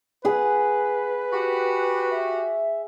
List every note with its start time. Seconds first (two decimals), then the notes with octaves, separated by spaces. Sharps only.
0.25 G#4 B4 F#5
1.33 F#4 G4
2.11 E5